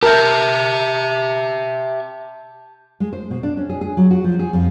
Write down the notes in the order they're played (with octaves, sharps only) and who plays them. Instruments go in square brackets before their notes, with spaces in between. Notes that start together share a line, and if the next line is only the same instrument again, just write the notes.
[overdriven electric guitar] G4 E5 [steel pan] A#4 [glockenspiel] A5 G6
[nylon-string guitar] G#3
C5
B2
D4
C#4
G#4
G#4
F#3
F#4
F3
G#4
F2